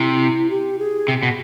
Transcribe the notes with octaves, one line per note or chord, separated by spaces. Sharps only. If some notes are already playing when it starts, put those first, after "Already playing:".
Already playing: C3 E4
G4
G#4
C3
B2